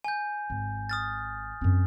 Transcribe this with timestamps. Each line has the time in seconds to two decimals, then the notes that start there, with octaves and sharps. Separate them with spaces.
0.04 G#5 G6
0.50 G#1
0.89 D#6 F6 A6
1.61 F#2 C4